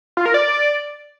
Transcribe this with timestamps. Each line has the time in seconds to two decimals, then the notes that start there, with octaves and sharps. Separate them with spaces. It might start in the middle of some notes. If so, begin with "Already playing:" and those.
0.17 F4
0.26 A#4
0.34 D5